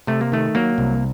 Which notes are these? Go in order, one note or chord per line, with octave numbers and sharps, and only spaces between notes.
C3 A3
A#3
D#3 A3
F#3 A#3
C2